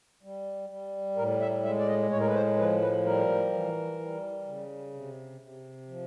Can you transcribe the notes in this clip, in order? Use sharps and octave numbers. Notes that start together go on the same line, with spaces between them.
G3
G3
A2 A#4
E5
G#3 E5
D5
D#5
A2 C#5
A#4
B4
C5
F3 B4
B4
G3 A#4
E3
G3
C#3
C3
C3
F3